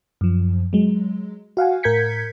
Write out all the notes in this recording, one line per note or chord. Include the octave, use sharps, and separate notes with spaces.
F#2 F3
F#3 G#3
F#4 F5 F#5 G#5
A2 A#4 G6 G#6 B6 C#7